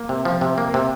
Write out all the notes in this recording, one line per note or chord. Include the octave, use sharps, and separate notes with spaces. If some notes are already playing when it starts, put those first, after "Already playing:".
Already playing: A#3
C3
F3
C3
A#3
C3